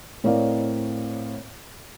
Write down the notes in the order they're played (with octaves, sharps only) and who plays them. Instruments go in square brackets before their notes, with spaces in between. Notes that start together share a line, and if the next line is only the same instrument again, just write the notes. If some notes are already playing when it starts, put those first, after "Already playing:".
[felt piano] A2 C4 A#4 C#5 D5 F5